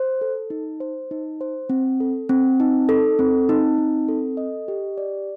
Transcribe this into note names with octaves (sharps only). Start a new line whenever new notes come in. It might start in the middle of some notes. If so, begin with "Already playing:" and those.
Already playing: C5
A4
D#4
C5
D#4
C5
C4
A4
C4
D#4
A4
C4
D#4
C4
A4
D#5
G4
D5